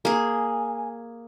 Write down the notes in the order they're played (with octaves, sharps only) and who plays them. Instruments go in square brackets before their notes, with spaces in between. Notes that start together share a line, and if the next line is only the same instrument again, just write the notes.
[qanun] A#3 G#4 [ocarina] G#5